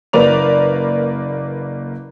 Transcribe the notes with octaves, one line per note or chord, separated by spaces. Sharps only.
F#1 A#3 B4 D5 F7